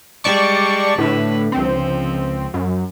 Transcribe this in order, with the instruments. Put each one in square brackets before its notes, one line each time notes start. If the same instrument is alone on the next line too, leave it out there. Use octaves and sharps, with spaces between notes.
[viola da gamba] G3 G#3 [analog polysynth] D5 A5 C#6
[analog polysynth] A2 [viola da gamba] D3 B4
[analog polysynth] C#2 C4 [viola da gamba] F3
[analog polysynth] F#2